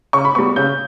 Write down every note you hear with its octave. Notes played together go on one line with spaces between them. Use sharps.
C#3 C#6
B5
G3 B3 C#6
C#3 G6